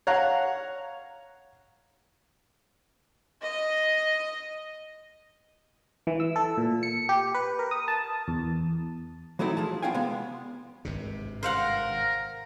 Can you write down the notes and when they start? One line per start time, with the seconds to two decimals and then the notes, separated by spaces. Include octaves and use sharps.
0.07 C#5 F5 F#5 A#5
3.42 D#5
6.07 E3
6.20 E6
6.36 A4
6.58 A#2
6.83 C#7
7.09 G4
7.34 B4
7.59 A#4
7.71 D#6
7.88 A5
8.28 E2
9.39 E3 F#3 A3 C4 D#4 E4
9.57 F3 G#4 A5
9.82 B3 C#4 F4 F5 G5 G#5
9.94 C3 G#3 B3
10.85 G#1 G2 C3
11.43 A#4 C5 F5 F#5